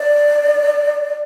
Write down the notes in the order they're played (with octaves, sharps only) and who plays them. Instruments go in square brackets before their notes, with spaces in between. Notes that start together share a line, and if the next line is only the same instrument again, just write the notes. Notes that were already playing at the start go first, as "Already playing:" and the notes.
Already playing: [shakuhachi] D5